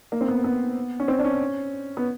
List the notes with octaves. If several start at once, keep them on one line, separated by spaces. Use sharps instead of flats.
A#3
C4
B3
B3
C#4
C4
D4
C#4
B3